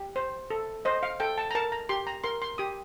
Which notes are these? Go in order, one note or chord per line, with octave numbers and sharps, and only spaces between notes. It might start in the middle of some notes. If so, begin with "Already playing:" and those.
Already playing: G4
C5
A4
C5 D#5
F5
A4 G5
A5
A#5
A#4 A5
A#5
G4 C6
A#5
A#4 C6
C6
G4 D#6